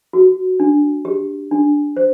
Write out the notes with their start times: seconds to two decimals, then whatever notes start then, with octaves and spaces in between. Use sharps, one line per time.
0.13 F#4
0.60 D4
1.05 G4
1.51 D4
1.97 C5